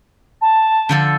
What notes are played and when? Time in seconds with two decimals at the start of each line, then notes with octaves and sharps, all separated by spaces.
0.42 A5
0.89 D3 F3 A4